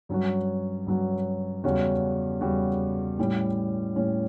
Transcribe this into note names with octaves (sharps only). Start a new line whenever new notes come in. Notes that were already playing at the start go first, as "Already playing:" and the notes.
G2 F#3 C#4 F#4
G2 F#3 C#4 F#4
E2 C#3 G3 C#4 F#4
E2 C#3 G3 C#4 F#4
A2 G3 C#4
A2 G3 C#4